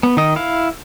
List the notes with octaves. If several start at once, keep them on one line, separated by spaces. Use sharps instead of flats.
B3
D#3 D#5
E4 F5